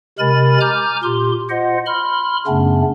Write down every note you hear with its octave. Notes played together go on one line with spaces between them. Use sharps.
C3 G#3 A#4 G#5 B5 A6
G#5 A#5 D6 F6 G6
A#2 G4 C6
F4 C5 D#5 F#5
B5 C6 F6
F#2 C#3 A3 B3 C#4 D4